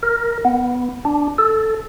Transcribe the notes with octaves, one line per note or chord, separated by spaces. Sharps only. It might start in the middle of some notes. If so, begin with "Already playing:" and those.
A#4
B3
D4
A4